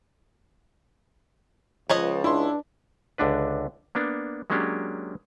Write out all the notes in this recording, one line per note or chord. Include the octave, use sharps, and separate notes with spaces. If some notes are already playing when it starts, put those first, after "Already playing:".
C#2 F3 B4 C#5 D#5
D4 E4 C6
C#2 D3 D4 B4
A#3 B3 D4
F#3 G#3 A#3 C#4 D4 G4